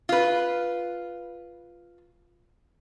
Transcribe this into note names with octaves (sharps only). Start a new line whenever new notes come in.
F4 B4